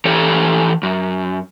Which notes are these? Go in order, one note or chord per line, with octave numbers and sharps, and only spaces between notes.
E3 G4 A4 C#5
F#2